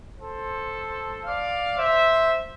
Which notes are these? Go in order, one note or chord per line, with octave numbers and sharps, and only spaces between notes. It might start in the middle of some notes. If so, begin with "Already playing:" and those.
A4 C5
D5 F5
C5 E5